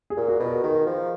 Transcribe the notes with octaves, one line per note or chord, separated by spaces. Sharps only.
G#4
A#2
F#4
B2
A#4
D#3 G#4
F3